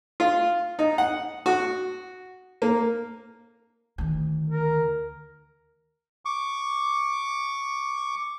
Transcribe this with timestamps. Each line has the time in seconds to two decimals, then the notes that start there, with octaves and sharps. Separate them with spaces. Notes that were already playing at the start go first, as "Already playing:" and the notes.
0.20 F4
0.79 D#4
0.98 F#5
1.46 F#4
2.62 A#3
3.98 D2 D#3
4.50 A#4
6.25 C#6 D6